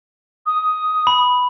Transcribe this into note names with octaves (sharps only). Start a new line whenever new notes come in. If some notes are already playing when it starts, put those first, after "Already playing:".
D#6
B5